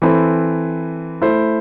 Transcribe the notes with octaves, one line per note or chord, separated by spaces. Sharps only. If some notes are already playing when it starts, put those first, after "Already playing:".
E3 C4 E4 A4 C5
A3 E4 C5